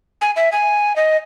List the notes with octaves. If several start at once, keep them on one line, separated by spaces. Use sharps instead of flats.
G#5
E5
G#5
D#5